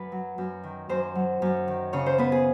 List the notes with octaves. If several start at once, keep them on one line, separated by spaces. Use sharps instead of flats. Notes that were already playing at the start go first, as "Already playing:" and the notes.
Already playing: F#2 B4
F#3
F#2
D#3
F#2 C5
F#3
F#2
D#3
C#3 C#5
C5
B3 B4
G#4